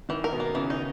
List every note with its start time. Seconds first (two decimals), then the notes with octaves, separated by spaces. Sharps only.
0.09 D#3 E3
0.24 A#4
0.32 B2 B3
0.40 A#3
0.55 C#3 E3 C#4
0.70 D#4